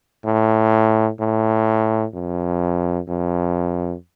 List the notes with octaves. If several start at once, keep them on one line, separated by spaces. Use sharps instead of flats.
A2
A2
F2
F2